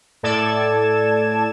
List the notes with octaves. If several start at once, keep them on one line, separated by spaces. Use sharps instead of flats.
A2 A4 D5 A5 G#6 E7